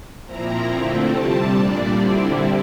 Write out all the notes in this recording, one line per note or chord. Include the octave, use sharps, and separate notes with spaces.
A#2 F3 C4 E4 A#5
D3 F3 A3 C4 E4
C3 G3 C4 A5
A#2 G3 D4 D5
D3 G3 C4 E4